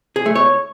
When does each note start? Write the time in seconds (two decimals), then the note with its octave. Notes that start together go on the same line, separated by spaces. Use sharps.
0.16 G#4
0.26 A3
0.36 C#5